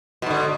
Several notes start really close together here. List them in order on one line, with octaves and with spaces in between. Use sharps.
B2 G#2 D3